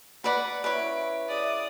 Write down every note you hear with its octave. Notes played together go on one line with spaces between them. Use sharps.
B4 D5 F#5 A#5 B5
C#4 E4 F#4 B4 C#5 D7
G#4 D5 E5 D#6